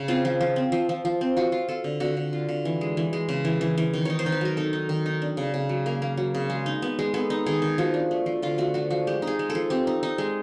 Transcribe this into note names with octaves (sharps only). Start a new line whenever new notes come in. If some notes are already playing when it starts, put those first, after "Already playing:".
Already playing: C#3
C4 F4
F3
F3
C4
F3
F3
F3
C4
F4 F#4
F4
F4 A4
D3
D3 F#4
D3
F4
D3
E3
G#3
E3
G#3
C#3
E3
E3
E3
D#3
D#4 C#5
C5
D#3
B4
F#3 A#4
D#4 A4
D#4
D#3
D#4
D4
C#3
C#3
F#3
A#3 A#4
A#3
F#3
C#3
G#3
D#4
B3
G#3
B3 A4
D#4
D#3 G#4
D#3
F3 F#4
D4
A3
F3
D3 F4
A3 F#4
F3 F#4
F3 F#4
G#3 G4
D#4
G#4
G#3
A4
F3
C4 G4
D#4
D#4
G#3